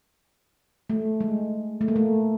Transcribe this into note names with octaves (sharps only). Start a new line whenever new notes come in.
A3
G#3
A3
A#3
A3